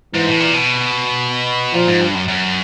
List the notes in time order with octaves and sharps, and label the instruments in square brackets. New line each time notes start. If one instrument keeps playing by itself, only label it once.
[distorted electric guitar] G#2 [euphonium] E3
[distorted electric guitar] A2
A#2
B2
[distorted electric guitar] A#2 [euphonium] F3
[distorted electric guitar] G#2
G2
F#2
F#2